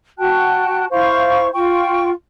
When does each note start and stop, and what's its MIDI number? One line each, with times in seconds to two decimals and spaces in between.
0.18 0.84 66
0.18 0.84 79
0.18 0.84 81
0.18 0.84 90
0.90 1.47 64
0.90 1.47 72
0.90 1.47 77
0.90 1.47 85
1.53 2.09 65
1.53 2.09 79
1.53 2.09 85